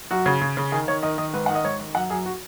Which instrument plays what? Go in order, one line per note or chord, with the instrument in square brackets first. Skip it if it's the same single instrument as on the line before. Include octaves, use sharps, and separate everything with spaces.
[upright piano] F#2 F#4
C#3
C#3
C#3
D#3 G#4
D#3 C#5
D#3 D#5
D#3 D#5
G#2 B4
D#3 F#5
D#5
G#2 C#5
D#3
F#2 F#5
F#2 G#4
F#4